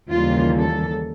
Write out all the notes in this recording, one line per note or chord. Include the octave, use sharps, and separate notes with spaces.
D#2 C#3 E3 G3 A#3 F4
A4